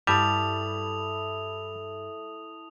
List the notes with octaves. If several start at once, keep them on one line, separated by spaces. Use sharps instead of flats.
G2 G3 E4 A4 E5 A5 D#6 F7